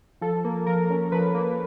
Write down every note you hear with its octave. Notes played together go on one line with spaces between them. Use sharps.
F3 A4
A#3
F3 A#4
C#4
F3 B4
A#3